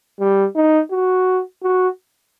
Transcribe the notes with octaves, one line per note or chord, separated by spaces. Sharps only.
G3
D#4
F#4
F#4